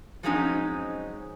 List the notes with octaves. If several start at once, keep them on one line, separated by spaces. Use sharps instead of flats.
F3 F#3 G#3 C4 C#4 D#4